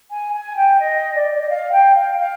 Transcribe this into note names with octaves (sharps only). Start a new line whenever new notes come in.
G#5
G#5
G5
D#5
D5
D5
D#5
F5
G5
F5
F5